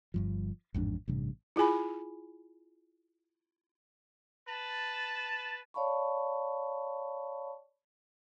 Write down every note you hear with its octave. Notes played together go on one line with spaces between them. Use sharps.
G1 G2 F3
A1 F2 G#2 D4
A1 G2 C3
E4 F4 G#4 G#5 B5
B4 A5
C#5 D5 F5 A5 B5 C#6